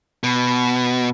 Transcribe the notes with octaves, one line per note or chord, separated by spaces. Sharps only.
B2